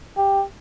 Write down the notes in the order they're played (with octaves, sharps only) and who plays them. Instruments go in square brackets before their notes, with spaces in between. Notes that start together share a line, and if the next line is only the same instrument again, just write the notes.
[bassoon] G4